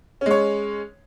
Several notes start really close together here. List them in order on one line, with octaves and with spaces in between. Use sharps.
C#4 G#3 C#5